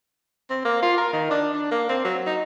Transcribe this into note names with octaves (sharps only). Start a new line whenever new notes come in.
C4
A#3
F4
A#4
D#3
D4
D4
A#3
C4
F#3
D#4